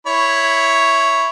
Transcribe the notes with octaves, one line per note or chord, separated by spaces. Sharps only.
E4 C#5 B5